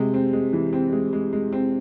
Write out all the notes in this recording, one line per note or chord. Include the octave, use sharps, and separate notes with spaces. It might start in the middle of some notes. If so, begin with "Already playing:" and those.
Already playing: C3 G#3
C4
G#3
E3
C4
G#3
G#3
G#3
C4